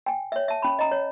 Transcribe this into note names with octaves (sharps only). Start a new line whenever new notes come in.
G5 G#5
C#5 E5
E5 A5
C#4 B5
D#5 A#5
C#5